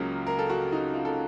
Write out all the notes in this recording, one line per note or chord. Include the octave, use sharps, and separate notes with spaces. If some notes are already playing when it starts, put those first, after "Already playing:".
Already playing: C#2 C#3 F#3 A#3 C#4 F4
A#4
A4
F#4
D#4
F4
A4